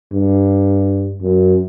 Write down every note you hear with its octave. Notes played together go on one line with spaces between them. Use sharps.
G2
F#2